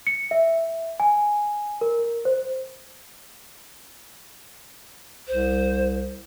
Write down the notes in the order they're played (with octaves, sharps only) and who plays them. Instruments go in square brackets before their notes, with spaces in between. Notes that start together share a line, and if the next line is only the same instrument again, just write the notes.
[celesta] C#7
E5
G#5
A#4
C5
[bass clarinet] C2 [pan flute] C5